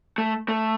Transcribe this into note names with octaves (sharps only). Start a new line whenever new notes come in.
A3
A3